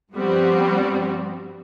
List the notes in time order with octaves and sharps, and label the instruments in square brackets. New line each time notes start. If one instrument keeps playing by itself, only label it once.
[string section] G2 F3 G3 B3 C4 F#4